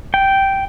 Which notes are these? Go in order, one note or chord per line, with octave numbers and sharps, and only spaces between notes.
G5